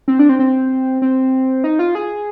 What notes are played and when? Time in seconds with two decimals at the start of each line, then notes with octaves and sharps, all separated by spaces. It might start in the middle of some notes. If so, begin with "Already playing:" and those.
0.08 C4
0.19 D4
0.29 C4
0.39 C4
1.02 C4
1.64 D#4
1.79 F4
1.95 G#4